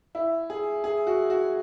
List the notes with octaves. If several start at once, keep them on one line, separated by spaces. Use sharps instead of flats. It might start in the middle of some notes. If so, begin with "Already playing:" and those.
E4
G#4
G#4
F#4
F#4